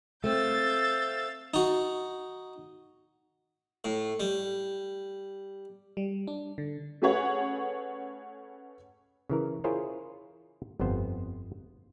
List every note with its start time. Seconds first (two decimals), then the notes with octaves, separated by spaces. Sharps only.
0.24 A3 C4 F5 E6 G6 A6
1.54 D#4 F#4
3.85 A2
4.20 G3
5.97 G3
6.27 D4
6.58 D3
7.02 A3 C#4 G#4 B4 C#5 F#5
9.30 C#3 E3 A#4
9.64 E4 F4 G#4 A#4 C5 C#5
10.80 G1 F2 B3 C5